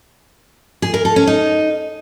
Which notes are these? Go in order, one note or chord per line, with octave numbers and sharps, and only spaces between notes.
G#4
A#4
A4
C#4
D#4